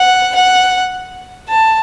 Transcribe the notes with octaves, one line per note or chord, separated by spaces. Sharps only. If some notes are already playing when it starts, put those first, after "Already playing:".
Already playing: F#5
F#5
A5